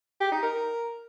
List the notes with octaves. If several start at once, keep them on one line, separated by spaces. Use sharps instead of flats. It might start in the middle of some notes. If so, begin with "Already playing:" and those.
G4
D#4
A#4